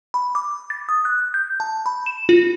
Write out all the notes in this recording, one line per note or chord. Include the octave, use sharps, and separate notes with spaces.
B5
D6
A6
D#6
F#6
G6
A5
B5
E7
F4